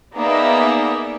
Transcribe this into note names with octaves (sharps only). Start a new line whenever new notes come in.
A#3 B3 D#4 G#4 D5 E5